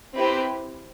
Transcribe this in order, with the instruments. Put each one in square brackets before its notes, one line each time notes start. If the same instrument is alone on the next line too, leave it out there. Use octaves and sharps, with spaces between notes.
[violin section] C4 E4 G4 B4